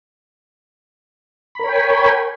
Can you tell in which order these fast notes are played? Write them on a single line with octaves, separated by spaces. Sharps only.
B5 A#4 C#5 G5 G#5